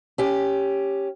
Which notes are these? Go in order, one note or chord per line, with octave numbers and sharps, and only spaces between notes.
C#4 G4